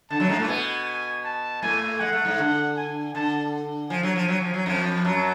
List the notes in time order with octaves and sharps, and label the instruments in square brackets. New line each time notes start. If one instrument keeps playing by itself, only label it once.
[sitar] D3 [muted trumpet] A5
[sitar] F#2 F#3
G#2 G#3
A2 A3
[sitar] B2 B3 [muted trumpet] G#5
[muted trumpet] A5
[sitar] A2 A3 [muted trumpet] G#5
[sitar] G#3 [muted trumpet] F#5
[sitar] A3
G#2 G#3
D3
[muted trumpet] G#5
[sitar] D3 [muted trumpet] A5
[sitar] F3 [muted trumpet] G#5
[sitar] F#3
F3
F#3
F3
F#3
F2 F3
[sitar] F#2 F#3 [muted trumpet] A5